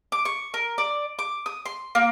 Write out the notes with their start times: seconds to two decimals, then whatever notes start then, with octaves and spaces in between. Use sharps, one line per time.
0.12 D6
0.25 C#6
0.54 A#4
0.78 D5
1.19 D6
1.46 D#6
1.66 C6
1.95 A#3